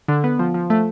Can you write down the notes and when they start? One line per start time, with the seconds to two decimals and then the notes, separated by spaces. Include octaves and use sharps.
0.08 D3
0.24 B3
0.39 F3
0.54 F3
0.70 A3